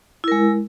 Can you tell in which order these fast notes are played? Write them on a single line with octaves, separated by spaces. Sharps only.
E4 A#4 G#3